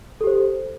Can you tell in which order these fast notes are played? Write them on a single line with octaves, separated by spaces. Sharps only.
A4 G4 C5